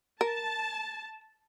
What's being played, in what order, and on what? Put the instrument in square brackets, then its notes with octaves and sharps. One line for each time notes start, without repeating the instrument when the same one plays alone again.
[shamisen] A#4 [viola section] A5